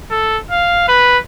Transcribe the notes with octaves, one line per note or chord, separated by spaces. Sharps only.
A4
F5
B4